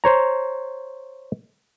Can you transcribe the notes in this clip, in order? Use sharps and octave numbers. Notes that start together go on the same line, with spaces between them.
C5 C#5 A#5